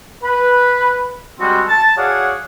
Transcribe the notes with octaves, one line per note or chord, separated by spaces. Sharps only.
B4
G3 G#3 C4 F#4
A5
F#4 G#4 C#5 D5 F5 F#5